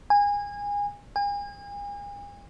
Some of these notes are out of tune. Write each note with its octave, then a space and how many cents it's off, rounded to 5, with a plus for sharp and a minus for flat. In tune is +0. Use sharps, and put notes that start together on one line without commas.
G#5 -25
G#5 -40